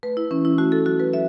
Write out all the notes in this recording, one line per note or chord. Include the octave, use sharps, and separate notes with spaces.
A3 B4
E4
E3 C#4
E4
A3 F#4
A4
F#3 F#4
B4
A3 E5